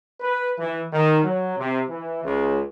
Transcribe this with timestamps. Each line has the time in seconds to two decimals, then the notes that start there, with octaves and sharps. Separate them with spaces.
0.20 B4
0.58 E3
0.92 D#3
1.23 F#3
1.57 C3
1.89 E3
2.23 C#2